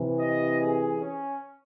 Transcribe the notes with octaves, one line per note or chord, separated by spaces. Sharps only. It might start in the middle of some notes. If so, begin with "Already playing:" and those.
Already playing: C3 E3
D#5
G#4
C#4